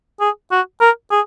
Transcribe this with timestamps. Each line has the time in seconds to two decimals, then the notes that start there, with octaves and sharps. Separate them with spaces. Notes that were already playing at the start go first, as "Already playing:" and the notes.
0.20 G#4
0.52 F#4
0.81 A#4
1.11 G#4